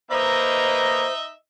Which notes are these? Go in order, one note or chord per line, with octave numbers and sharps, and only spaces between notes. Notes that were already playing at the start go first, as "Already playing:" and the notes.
A#3 D#4 B4 C5 D#5 E5 A#5